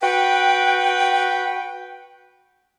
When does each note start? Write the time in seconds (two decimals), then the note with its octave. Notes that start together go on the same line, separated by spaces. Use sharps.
0.01 F#4 B4 G5